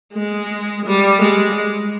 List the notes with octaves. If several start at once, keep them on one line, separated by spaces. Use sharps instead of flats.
G#3
G3
G#3